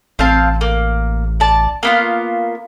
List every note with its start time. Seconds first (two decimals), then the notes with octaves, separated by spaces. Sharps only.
0.19 A1 C4 F5 A5
0.61 A#3
1.40 D5 A5
1.83 A#3 B3 F4